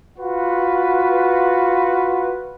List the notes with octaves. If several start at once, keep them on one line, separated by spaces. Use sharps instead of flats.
F4 F#4 B4